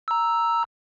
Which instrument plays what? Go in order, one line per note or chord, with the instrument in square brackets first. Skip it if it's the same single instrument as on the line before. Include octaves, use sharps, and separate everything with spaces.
[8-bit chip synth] A#5 E6